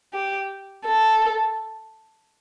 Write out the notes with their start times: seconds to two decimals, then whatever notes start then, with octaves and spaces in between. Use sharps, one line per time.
0.13 G4
0.85 A4